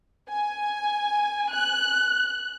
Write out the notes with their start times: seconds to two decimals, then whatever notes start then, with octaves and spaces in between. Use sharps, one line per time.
0.28 G#5
1.51 F#6